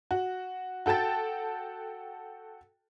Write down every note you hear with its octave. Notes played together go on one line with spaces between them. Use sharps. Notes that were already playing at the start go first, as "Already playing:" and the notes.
F#4
F#4 A4 G5 A5 A6